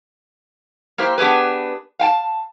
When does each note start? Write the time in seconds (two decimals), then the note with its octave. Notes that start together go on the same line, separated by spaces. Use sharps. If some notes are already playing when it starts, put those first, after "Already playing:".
0.98 A#3 E4 G4 C5
1.18 B3 D4 G4 G#4 B4
1.99 F5 G5 A5